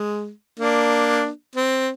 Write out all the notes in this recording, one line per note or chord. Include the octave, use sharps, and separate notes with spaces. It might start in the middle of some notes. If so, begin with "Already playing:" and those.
Already playing: G#3
A#3 D4
C4